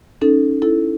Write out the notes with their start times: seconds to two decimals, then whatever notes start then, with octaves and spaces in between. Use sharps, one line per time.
0.21 C#4 D#4 A4
0.62 E4 A4